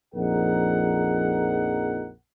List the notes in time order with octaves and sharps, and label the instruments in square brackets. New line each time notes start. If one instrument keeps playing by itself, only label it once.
[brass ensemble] A#1 F2 D#4 G#4 A#4 F#5